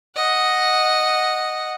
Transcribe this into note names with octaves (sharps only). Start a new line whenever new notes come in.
D#5 F#5